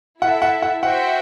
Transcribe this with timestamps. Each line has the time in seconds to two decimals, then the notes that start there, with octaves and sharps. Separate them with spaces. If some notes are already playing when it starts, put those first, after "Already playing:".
0.21 E4 A4 E5 F#5
0.42 F#5
0.62 F#5
0.83 F#4 C5 E5 F#5 G5